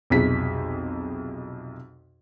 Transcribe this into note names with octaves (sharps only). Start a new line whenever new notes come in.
B1 F2 C3 G#4 B6